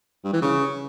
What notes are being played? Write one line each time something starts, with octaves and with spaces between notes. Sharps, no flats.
G2
E3
C#3